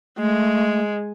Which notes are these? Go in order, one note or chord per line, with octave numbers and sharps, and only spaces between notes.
G#3 A3